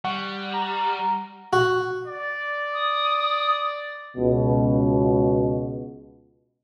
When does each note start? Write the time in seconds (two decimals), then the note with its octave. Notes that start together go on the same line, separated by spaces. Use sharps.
0.04 G3 F#5 C#6
0.53 A#5
1.53 F#4
2.06 D5
2.74 D#6
4.17 C#2 B2